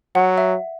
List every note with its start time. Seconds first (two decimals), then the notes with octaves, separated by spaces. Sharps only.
0.15 F#3 F#5
0.38 E5